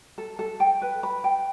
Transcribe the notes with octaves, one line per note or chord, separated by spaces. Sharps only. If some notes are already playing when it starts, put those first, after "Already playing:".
A4
A4
G5
B4
B5
G5